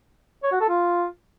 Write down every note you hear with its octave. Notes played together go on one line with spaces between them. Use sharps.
C#5
F#4
A4
F4